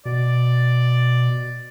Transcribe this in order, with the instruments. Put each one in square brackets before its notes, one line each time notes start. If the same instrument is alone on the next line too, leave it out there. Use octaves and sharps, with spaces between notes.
[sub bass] B2 [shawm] D5